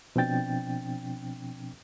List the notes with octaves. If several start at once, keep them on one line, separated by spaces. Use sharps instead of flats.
B2 F3 C4 D4 G5 A6